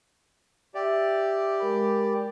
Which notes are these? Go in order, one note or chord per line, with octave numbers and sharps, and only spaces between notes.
G4 D5 E5 E6
G#3 A#4 B5